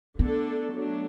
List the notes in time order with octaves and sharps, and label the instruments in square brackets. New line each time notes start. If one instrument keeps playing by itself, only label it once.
[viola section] D3 A3 D4 A4 [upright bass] B3
[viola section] F#3 A3 D4